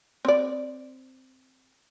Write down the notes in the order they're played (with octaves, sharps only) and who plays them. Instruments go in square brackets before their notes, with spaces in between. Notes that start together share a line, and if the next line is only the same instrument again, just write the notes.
[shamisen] C4 D5